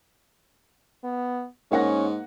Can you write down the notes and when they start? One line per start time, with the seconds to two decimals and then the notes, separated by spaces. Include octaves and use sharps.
1.04 B3
1.71 G#2 A#3 C#4 F#5 A#6